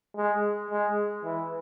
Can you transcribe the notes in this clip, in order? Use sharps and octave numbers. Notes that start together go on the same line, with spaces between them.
G#3
G#3
E3